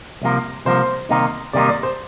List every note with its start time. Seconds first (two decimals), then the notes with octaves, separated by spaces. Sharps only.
0.22 C2 C3 F3 A#3
0.65 C2 C3 F3 A#3 C5
1.09 C3 D#3 G3 A#3 D#4
1.53 C3 D#3 G3 A#3 D#4 D5
1.69 D5
1.83 C5